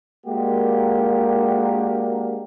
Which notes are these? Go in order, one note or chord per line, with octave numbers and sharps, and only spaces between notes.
G#3 A#3 D4 F#4 G4 A#4